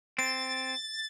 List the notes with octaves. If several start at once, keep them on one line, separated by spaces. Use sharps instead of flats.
C4 A6